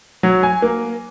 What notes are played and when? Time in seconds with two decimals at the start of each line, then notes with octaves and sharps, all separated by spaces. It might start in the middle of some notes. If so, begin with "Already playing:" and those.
0.23 F#3
0.43 G#5
0.62 A#3